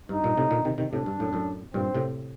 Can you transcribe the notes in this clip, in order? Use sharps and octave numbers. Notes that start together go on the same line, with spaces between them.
G2 D#4
G2 A#2
A2 C3
A#2 D3
C3 D#3
C3 D#3
A2 C3 D4
G2
F#2 A2
F#2 A2
G2 A#2 C4
A2 C3